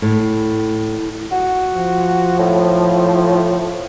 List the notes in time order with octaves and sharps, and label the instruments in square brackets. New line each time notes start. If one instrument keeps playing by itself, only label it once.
[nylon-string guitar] A2
[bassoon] F#4
[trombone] F3
[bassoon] A2